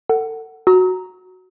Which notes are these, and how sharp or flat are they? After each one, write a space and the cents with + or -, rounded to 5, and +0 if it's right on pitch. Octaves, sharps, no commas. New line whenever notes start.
A4 +35 F#5 +15
F#4 +0 A#5 +0 E6 -45